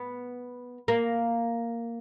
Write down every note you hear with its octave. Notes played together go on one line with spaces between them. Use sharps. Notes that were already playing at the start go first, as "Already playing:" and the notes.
Already playing: B3
A#3